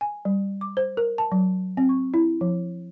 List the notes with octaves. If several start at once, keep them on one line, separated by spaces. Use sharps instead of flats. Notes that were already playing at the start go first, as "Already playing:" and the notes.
G#5
G3
D6
C5
A#4
A5
F#3
C4
C#6
E4
F3